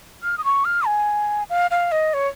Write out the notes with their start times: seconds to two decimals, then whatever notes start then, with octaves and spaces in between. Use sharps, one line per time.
0.23 F6
0.38 D#6
0.44 C#6
0.65 F6
0.86 G#5
1.50 F5
1.71 F5
1.92 D#5
2.14 C#5